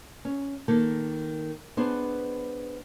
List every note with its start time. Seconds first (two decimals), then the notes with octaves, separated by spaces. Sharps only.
0.25 C#4
0.68 D#3 A#3 A4
1.77 B3 D4 G#4 C5